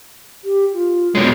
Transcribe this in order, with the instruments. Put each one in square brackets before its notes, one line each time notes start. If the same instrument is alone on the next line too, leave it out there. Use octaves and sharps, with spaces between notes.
[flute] G4
F4
[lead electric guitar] B2 G#3 [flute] C#5